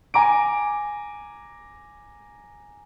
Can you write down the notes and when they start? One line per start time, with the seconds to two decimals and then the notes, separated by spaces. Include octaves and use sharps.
0.14 G#5 A#5 D6 D7